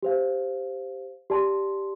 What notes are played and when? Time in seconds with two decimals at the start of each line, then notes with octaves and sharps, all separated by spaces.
0.03 G4 C5 F5
1.30 G4 D5 A5 C6